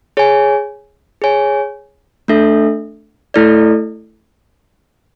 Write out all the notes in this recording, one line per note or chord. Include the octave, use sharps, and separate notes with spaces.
G#4 C#5 G#5
G#4 C#5 G#5
A3 D4 A4 E5
A3 E4 A4 D5